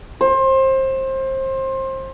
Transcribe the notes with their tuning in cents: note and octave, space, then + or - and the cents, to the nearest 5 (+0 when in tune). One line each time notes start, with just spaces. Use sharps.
C5 +25